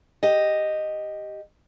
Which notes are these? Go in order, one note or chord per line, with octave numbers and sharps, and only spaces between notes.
G4 D#5